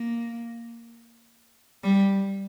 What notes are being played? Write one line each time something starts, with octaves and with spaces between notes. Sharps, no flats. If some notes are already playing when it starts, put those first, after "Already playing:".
Already playing: A#3
G3